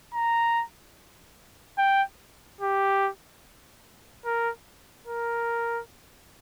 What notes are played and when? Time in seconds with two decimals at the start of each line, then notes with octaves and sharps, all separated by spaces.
0.14 A#5
1.78 G5
2.61 G4
4.25 A#4
5.07 A#4